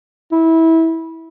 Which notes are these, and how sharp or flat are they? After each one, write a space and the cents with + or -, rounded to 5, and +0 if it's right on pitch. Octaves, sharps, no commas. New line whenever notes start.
E4 -20